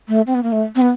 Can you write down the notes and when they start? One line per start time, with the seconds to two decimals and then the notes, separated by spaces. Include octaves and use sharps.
0.08 A3
0.27 C4
0.35 B3
0.43 A#3
0.52 A3
0.75 C4
0.81 B3